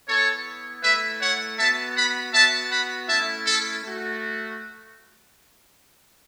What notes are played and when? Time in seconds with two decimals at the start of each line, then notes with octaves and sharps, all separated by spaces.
0.08 B3 E4 A4 C#5
0.84 A3 E4 B4 E5
1.21 C#5 F#5
1.58 B3 F#4 E5 A5
1.96 F#5 B5
2.34 B3 F#4 E5 A5
2.71 F#5 B5
3.09 A3 C#4 E4 E5 A5
3.47 A4
3.84 A3 F#4